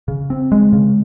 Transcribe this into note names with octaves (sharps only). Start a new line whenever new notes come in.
C#3
C4
G#3
C#3